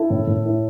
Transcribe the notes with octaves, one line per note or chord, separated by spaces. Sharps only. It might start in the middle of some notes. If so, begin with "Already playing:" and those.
Already playing: E4 A4
A2
A2
E4